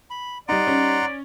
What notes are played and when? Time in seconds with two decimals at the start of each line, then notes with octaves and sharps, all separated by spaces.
0.10 B5
0.49 G3 D#4 D5 F#5 A#5 C6
0.67 C#4